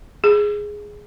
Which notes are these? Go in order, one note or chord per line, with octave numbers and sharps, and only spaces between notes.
G#4